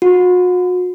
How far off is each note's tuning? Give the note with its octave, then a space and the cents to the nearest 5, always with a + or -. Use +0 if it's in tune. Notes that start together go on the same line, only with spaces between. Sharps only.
F#4 -40